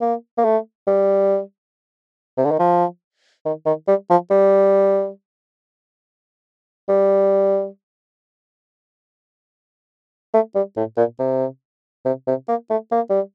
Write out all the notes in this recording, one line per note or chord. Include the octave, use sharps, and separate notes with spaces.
A#3
A#3
A3
G3
C3
D3
D#3
F3
D#3
D#3
G3
F3
G3
G3
A3
G3
A2
A#2
C3
C3
C3
A#3
A3
A#3
G3